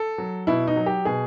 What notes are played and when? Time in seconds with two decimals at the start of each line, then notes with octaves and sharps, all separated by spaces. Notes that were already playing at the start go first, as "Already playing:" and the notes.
Already playing: A4
0.18 F#3
0.47 B2 E4
0.67 D#4
0.76 F#3
0.86 G4
1.05 B2 G#4